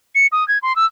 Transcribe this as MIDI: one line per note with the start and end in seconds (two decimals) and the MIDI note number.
0.15 0.27 97
0.32 0.46 87
0.48 0.58 92
0.62 0.75 84
0.76 0.85 88